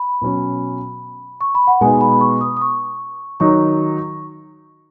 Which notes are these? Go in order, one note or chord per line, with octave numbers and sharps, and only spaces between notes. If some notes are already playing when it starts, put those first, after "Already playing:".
Already playing: B5
B2 F#3 C#4
C#6
B5
F#5
B2 G#3 B3 D#4 G#5
B5
C#6
D#6
D#6
C#6
D#3 F#3 D#4 C#6